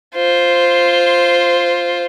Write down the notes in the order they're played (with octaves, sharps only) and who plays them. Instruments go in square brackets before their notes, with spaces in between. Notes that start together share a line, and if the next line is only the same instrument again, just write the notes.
[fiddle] F4 C5